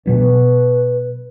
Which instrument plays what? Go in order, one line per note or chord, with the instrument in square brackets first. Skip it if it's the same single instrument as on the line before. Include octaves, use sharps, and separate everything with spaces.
[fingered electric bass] B2 F#3 D4 [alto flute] B4